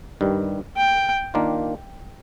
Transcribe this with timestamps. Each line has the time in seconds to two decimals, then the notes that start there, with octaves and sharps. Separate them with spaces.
0.21 G2 D#3 G3
0.77 G5
1.34 D#3 A#3 D4 F4